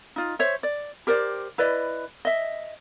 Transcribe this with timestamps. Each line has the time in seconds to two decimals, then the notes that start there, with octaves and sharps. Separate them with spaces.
0.16 D#4 F4
0.39 C5 C#5 E5
0.63 D5
1.07 G4 A#4 C5 D5
1.58 E4 B4 D5 D#5
2.25 D#5 E5